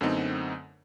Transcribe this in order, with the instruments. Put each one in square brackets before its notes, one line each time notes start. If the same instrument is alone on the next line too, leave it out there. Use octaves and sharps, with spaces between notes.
[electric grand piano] F#2 D3 A3 B3 C4 D#4